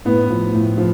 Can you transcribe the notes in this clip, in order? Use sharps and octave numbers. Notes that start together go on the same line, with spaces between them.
A2 B3
F3
A2
F3